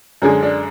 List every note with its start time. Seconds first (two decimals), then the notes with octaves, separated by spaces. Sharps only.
0.22 F#2 D3 G#3 G#4
0.43 D4